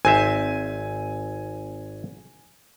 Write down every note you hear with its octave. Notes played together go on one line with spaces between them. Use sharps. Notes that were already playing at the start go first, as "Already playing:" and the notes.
G#1 C4 E5 G#5